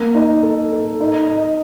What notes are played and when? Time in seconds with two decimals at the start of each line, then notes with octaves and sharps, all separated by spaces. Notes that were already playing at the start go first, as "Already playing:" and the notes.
Already playing: A#3
0.15 D#4
0.43 A4
0.72 A4
1.00 D#4
1.28 D#5